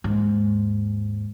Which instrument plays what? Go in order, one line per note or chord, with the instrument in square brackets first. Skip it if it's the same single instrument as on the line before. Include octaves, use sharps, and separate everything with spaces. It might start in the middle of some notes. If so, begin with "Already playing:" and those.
[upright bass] D#2 G#2